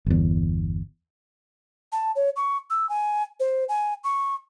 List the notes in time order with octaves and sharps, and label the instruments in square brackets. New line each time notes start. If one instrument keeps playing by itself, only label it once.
[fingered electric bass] G1 E2
[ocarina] A5
C#5
C#6
E6
G#5
C5
G#5
C#6